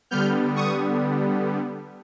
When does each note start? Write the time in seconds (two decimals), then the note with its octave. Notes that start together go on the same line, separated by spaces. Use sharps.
0.11 D3 G3 B3 F6 G6
0.56 C#6 D#6